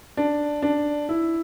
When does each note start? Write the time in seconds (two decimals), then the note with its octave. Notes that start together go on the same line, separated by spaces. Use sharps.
0.17 D4
0.62 D4
1.09 E4